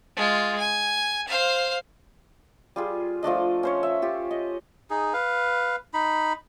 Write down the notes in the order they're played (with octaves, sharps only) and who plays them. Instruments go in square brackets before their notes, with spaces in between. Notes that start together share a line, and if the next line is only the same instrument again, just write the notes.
[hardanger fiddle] G#3 F4
G#5
C5 F5
[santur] G3 F4 G#4
F3 A3 D4 D#5
C#4 C5 C#5
E5
F4 G4
D#5
[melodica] D#4 G#4
B4 F5
D#4 B5